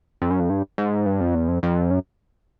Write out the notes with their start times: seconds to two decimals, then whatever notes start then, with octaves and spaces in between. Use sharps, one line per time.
0.22 F2
0.31 F#2
0.40 F2
0.50 G2
0.78 G#2
1.06 G2
1.21 F2
1.35 E2
1.48 F2
1.63 F2
1.90 F#2